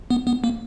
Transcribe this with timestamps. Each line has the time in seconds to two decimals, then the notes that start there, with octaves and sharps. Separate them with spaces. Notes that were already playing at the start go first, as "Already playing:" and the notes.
0.10 B3
0.27 B3
0.44 A#3